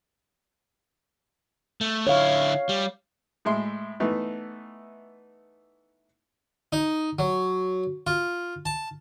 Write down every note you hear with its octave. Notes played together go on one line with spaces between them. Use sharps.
A3
D3 E4 C#5 F5
G3
A2 G#3 E5 C6
E3 A3 B3 D#4
D#4
F#3
F4
A5